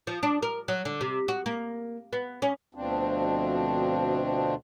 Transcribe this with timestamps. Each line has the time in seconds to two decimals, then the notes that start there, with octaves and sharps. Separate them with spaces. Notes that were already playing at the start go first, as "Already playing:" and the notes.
0.07 F3
0.23 D4
0.43 A#4
0.68 F#3
0.85 D3
1.01 C3
1.28 F#4
1.46 A#3
2.13 B3
2.42 C#4
2.75 D2 B2 F3 C4 D4